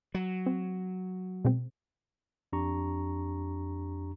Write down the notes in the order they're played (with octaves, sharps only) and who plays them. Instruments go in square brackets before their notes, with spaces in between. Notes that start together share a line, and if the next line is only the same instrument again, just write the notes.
[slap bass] F#3
[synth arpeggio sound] C4
B2 G#3 C4
[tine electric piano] F2 D4 G4 A#5 C#6